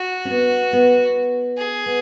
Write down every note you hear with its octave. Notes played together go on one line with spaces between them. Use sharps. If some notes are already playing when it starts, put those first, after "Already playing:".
Already playing: F#4
C#4
B3
B3
G#4
B3